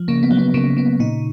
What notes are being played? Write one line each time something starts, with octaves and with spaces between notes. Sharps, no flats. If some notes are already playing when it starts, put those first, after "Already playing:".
Already playing: F3
C#3 A#3
B3
F#3
B3
C#3 A#3
C#3 B3
A#2 D#4